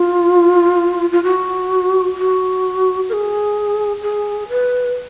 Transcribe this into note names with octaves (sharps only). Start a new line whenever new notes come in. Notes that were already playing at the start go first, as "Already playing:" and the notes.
Already playing: F4
F4
F#4
F#4
A#4
G#4
G#4
B4